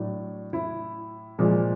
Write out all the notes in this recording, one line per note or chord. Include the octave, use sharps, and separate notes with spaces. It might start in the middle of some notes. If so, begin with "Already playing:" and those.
Already playing: A2 F#3 D4
E4
A#2 F3 G#3